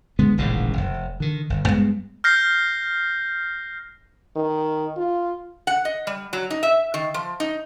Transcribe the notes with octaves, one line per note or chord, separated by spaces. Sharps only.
D3 G#3 B3
D#1 A1 G#2 C#3
F1
D3 D#3
G1
G2 G#3 B3
F6 G6 A#6 C7
D#3
F4
F#5
D#5
G3
F#3
D#4
E5
D#3
F3
D#4